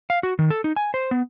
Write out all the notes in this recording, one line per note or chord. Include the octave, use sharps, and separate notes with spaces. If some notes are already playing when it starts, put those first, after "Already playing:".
F5
F#4
D#3
A4
D#4
G#5
C5
B3